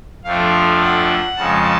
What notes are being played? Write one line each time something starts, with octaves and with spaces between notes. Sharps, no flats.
F2 F3 A3 D4 F5
F#5
F2 C#3 G#3 A5